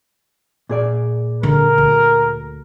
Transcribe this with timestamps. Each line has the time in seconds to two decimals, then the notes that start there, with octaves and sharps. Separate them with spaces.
0.69 A#2 G#4 D5
1.43 D3 A#4
1.78 D2